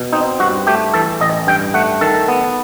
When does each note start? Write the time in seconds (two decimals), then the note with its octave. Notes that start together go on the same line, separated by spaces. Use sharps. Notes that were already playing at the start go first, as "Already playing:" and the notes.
Already playing: B2
0.13 C4 D#4
0.40 G2 F#4
0.67 A3 G4
0.93 E3 A4
1.21 A1 D#5
1.47 G2 G5
1.74 A3 F#5
2.01 D#3 A4
2.28 B3